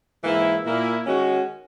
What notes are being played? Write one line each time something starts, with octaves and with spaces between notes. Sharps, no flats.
G#2 E3 A#3 E4
A#2 A#3 E4
D#3 G#3 C#4 F#4